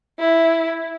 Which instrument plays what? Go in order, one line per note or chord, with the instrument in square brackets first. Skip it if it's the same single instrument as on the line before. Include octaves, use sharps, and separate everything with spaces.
[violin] E4